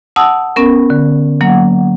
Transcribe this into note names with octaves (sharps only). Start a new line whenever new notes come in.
F#5 A5 D#6 E6
B3 C#4 A#4
D3
F#3 A#3 F#5